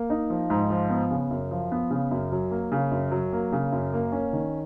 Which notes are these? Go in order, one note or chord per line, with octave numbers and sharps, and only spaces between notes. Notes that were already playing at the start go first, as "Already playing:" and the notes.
Already playing: A#3
D#4
F3
G#2
F3
B3
C#3
F#2
F3
B3
C#3
F#2
F#3
A#3
C#3
F#2
F#3
A#3
C#3
F#2
A#3
C#4
D#3